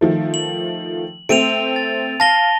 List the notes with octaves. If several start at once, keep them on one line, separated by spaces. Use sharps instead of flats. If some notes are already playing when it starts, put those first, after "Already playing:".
D#3 F3 A3
F#7
A3 C4 D7 D#7 F7
A6
F5 A5 A#6 G7